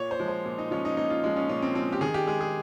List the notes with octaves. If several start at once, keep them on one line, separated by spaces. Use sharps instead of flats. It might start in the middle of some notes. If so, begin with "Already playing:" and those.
Already playing: A#2 C#5
C5
F3 G#3
C5
A#2
D#4
F3 G#3 C#4
D#4
A#2 D#4
F4
F3 G#3
C#4
A#2 C#4
C4
F3 G#3 C4
G4
D#3 G#4
G4
G#3 G#4
G#4